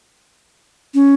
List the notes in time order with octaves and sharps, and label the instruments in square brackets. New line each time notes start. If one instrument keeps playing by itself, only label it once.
[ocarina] C#4